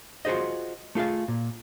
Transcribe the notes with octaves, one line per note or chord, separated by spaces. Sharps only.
F4 F#4 G#4 C5 D#5
A3 F4 G#4 F5
A#2